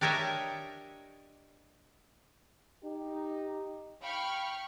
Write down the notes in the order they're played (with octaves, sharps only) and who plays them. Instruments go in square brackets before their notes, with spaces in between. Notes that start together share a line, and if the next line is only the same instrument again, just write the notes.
[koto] D4 G4 A#4 C#5 D#5 E5
[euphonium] D#4 [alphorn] G4
[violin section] F5 G5 B5 C#6 F6